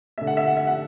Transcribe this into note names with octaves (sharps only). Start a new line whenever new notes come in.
D3 A3 E5
F#5
E5
F#5
E5
F#5